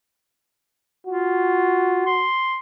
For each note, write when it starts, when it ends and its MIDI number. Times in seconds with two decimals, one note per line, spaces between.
1.07 2.06 65
1.07 2.26 66
2.06 2.59 84